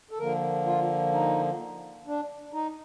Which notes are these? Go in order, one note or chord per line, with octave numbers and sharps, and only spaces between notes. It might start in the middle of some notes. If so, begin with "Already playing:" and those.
A4
D3 F3 A#3 A#4
F4
D#4
D4
D#4